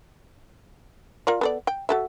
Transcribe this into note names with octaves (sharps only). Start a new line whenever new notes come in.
F4 A#4 D5
B3 A4 D5
G5
F#4 A4 E5